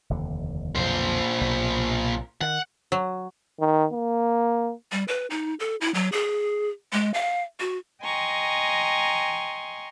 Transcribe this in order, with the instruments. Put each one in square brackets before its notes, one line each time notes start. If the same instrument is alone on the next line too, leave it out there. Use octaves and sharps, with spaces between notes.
[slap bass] F1 D#2 D3
[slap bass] B1 F2 D3 [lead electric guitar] A#2 C5
[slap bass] B1 C3
[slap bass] D#3 [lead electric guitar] F#5
[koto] F#3
[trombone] D#3
A#3
[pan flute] G3
B4
D#4
A4
E4
F#3
G#4
G#3
F5
F#4
[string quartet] D#5 G5 G#5 A#5 C6 C#6